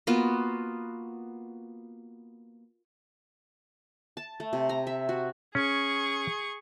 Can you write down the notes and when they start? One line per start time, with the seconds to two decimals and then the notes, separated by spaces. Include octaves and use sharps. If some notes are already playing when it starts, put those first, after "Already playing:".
0.07 A#3 B3 F4 F#4
4.17 A5
4.40 A3
4.53 C3
4.69 A#5
4.87 E5
5.09 F#4
5.55 C#4 G#4 C#6